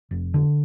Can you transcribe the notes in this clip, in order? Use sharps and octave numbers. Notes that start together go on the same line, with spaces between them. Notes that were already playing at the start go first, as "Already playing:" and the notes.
F1
D3